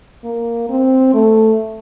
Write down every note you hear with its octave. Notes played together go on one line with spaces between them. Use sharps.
A#3
C4
A3